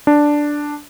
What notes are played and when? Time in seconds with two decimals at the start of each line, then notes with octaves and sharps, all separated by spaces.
0.07 D4